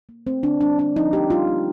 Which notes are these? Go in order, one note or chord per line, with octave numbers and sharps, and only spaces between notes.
A#3
A3 C4
D3 D4
G3 D4
A#3 D4
F3 D#4
A3 G4
G3 F4
A#3